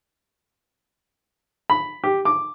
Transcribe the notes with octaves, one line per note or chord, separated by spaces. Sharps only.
B5
G4
D6